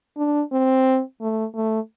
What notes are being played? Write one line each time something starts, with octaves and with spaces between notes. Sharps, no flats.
D4
C4
A3
A3